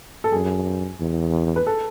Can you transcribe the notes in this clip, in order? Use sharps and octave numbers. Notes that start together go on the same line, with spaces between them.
A4
F#2 G#4
E2
B4
A4